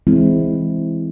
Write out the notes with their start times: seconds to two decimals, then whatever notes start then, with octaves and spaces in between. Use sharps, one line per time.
0.07 E3 G#3 C4 E4